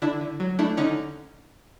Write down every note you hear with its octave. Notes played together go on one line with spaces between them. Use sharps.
D3 D4 E4
D3
F#3
A3 D4 E4
D3 C#4 D#4